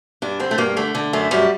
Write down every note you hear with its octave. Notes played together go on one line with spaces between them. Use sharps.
G2 D4
D3 C4
A3
G2 A#3
D3 A3
D3
F#2 A3
F#2 G3